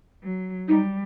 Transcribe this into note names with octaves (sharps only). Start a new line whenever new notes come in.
F#3
G3 D#4